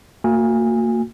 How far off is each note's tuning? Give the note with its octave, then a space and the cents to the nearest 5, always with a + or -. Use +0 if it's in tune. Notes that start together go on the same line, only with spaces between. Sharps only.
A#3 -35 F#4 -30 G#5 -20